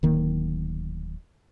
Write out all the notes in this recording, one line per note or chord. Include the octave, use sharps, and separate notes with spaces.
D1 D#3 A#3